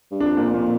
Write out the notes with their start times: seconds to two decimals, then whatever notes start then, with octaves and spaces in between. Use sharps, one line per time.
0.11 G2
0.20 F2 D4
0.37 A#2
0.54 A#2